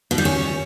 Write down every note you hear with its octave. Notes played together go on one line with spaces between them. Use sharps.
B2
G3
C#4